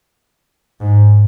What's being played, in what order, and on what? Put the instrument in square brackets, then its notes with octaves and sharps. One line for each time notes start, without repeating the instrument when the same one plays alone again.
[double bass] G#2